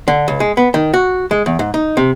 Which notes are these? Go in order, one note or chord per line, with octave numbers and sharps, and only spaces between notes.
D3
C#2
G#3
B3
D#3
F#4
G#3
E2
G#2
D#4
C3